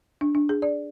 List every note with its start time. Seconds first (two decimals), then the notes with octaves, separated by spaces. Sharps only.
0.21 D4
0.35 D4
0.49 G#4
0.62 D5